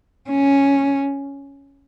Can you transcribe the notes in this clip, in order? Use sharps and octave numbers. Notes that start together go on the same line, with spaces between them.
C#4